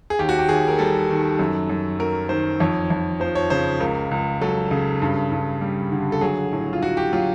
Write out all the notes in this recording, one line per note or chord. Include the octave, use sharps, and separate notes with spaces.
G#4
D#2 G4
F#4
G4
D#2 G#4
A#4
G3 A4
D#3
F#2
F#2
F#3 A#4
D#3 C5
F2 C#5
F2
F3 C5
C#5
C#3 C5
C#2 A#4
C#2
F#3 A4
C#3
G2
G2
G3
D3
A4
F#3 G#4
A2
F4
A2 F#4
G4
F#3 F4